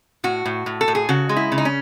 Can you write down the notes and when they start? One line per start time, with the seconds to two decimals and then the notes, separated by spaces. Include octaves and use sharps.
0.24 A2 F#4
0.45 A2
0.66 A2
0.81 A4
0.88 A2
0.95 G#4
1.09 C#3 F#4
1.29 G#3
1.36 E4
1.52 C#3
1.58 D#4
1.65 C#4